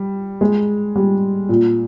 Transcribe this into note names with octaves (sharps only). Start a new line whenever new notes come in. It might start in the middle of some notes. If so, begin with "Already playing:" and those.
Already playing: G3
G#3
G3
A#2